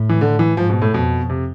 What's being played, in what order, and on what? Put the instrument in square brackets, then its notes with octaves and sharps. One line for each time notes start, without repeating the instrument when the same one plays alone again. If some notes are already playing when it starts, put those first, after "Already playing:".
Already playing: [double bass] A2
[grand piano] E3
D3
E3
[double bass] G#2 [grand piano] F3
[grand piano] B2
A2
[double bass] F2 [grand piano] B2
[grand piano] C3